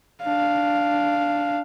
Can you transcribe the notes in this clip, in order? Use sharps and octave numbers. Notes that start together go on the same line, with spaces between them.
D4 F5